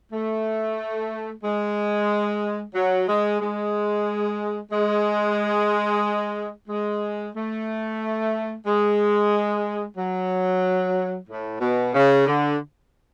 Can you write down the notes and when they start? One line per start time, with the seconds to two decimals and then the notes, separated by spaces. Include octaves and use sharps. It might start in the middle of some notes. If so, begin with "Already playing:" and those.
0.13 A3
1.43 G#3
2.75 F#3
3.08 G#3
3.40 G#3
4.72 G#3
6.68 G#3
7.35 A3
8.65 G#3
9.97 F#3
11.28 A2
11.60 B2
11.94 C#3
12.27 D3